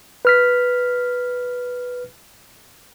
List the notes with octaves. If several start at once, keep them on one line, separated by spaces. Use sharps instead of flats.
B4 F6 B6